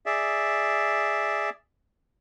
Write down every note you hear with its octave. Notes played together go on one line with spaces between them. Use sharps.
G#4 D5 E5